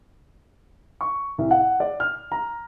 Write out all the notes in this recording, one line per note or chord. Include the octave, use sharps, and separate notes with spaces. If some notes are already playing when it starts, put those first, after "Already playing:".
C#6
C2
F#5
D5
F6
A#5